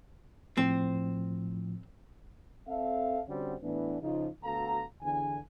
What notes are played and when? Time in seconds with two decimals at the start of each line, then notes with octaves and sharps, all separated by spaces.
0.57 A2 F3 C4
2.68 C4 A4 E5 F5
3.28 D3 G3 C4 C#4 F#4
3.62 A2 E3 B3 D4
4.01 C#3 F3 D#4 F4
4.43 D2 B3 F#4 A4 F5 A#5
5.02 E2 D3 G#5